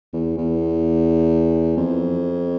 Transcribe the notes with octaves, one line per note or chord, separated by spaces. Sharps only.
E2
E2
F2